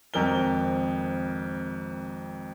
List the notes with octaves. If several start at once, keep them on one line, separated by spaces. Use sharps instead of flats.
G#1 F2 A#4 G7